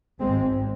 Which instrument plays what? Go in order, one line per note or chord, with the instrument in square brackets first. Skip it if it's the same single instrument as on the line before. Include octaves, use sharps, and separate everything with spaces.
[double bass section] G#1 G#2 G#3 C4